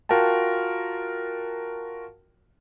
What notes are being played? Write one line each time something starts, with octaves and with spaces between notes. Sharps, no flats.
F4 F#4 A#4 F5 G5 A5